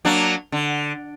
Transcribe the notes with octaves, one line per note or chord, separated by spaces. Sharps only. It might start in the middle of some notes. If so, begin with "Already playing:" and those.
F#3 A#3 D4
D3